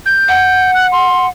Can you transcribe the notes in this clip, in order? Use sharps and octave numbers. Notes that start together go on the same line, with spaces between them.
G6
F#5
F#6
C6